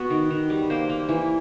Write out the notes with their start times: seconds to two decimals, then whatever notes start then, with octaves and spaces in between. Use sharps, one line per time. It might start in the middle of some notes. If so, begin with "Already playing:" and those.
Already playing: B3 F#4
0.10 D#3
0.30 D#3
0.50 G3
0.70 A#3 C5
0.89 A#3
1.09 E3